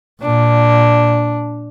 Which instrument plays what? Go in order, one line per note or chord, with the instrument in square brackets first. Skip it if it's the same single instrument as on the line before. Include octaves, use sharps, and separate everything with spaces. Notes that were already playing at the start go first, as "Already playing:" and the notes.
[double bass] A#2 [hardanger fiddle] D4